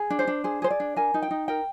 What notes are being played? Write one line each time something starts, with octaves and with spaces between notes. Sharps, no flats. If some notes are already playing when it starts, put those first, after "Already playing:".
Already playing: G#4
D4
C5
D4
G#4 C5
G#4 C5
D5
D4
A#4 G#5
D#4
G5
D#4
A#4 G5